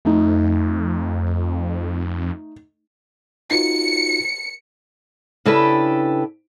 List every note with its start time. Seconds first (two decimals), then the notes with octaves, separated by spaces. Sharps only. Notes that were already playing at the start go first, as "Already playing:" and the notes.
0.05 F2 A3 D#4
3.51 D#4 F4 F#4 C#7
5.45 C#3 D4 E4 G4 A4 B4